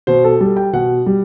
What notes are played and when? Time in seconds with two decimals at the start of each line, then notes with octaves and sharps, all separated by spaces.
0.07 B2 C5
0.24 A4
0.40 G3 A4
0.57 G5
0.73 B2 F#5
1.06 G3